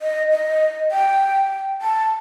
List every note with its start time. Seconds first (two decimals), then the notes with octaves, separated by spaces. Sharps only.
0.02 D#5
0.31 D#5
0.91 G5
1.82 A5